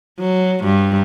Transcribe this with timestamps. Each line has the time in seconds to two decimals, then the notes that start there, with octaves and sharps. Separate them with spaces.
0.19 F#3
0.65 G2